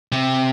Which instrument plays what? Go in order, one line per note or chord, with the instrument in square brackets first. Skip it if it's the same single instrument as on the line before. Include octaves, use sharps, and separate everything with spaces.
[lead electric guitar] C3